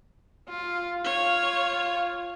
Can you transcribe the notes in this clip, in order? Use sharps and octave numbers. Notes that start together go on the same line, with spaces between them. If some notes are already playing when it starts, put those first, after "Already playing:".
F4 F5
F4 C#5